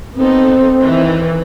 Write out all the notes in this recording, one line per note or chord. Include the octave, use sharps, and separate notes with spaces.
B3 C4 D#4 A4
D#3 E3